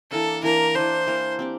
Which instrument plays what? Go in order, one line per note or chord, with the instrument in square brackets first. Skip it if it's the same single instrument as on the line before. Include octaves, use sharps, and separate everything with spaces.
[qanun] E3 A#3 D4 [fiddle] A4
[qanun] E3 A#3 D4 [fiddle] A#4
[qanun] E3 A#3 D4 [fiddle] C5
[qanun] E3 A#3 D4
C4 G4 D5